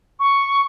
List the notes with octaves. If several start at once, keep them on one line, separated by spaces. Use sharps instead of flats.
C#6